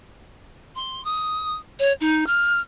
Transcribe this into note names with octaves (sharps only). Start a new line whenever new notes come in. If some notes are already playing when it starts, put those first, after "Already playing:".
C6
D#6
C#5
D#4
F6